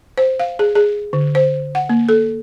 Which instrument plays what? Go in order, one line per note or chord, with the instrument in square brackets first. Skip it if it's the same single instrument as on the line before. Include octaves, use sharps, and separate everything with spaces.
[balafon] C5
F5
G#4
G#4
D3
C5
F#5
A#3
A4